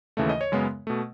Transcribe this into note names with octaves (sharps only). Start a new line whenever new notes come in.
D#2 C#3 E3 A3 E5
D#5
C#5
F#2 C#3 G#3 B3
B2 A3